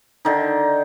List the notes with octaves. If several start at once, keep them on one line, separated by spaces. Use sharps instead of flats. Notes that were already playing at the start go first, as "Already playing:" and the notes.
D3 D#3 D#4